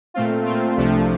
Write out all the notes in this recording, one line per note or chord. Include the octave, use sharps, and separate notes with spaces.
A#2 A3 C4 F4
A#2 A3 C4 F4
C2 C3 F3 A3 D4